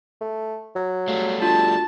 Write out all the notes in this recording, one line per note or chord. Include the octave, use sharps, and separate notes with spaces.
A3
F#3
G3 A3 F5
D4 F4 F#4 A5